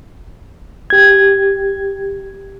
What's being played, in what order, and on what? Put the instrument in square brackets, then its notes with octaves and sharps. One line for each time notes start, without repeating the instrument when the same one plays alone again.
[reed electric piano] G4 G#6